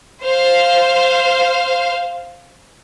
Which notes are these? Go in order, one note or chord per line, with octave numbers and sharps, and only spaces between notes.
C5 F5